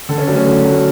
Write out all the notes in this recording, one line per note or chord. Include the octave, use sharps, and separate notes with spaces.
D3 A4
C#4
F#3 A3 D4
C#4
D3
F#3 A3